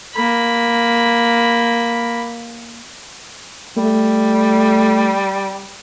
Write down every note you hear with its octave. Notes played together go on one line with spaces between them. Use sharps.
A#3 B5
G3 A3